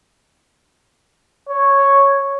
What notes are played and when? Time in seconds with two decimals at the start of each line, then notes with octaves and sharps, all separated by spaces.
1.49 C#5